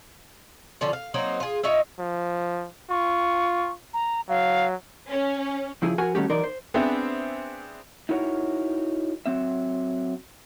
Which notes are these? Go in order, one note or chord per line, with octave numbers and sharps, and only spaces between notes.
D3 F3 C#4 F4
F5
F#3 A#3 C4 D#4
F4 G#4
D#4 F4 C#5 E5
F3
F4 C#6
A#5
F#3 F5
C#4
C#3 F3 E4 G#4
F3 F#4 A#4 F#5 G#5
D#3 G3 A3 C#4 F#4 G4
E3 F#3 D#4 A#4 D5 C6
C5
B3 C4 D4 G#4 C5 E5
D#4 E4 F#4 A#4 C#5
F#3 C4 E5